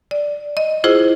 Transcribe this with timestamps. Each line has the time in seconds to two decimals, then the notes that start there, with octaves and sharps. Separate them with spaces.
0.11 D5
0.57 D#5
0.84 E4 F4 G#4 C5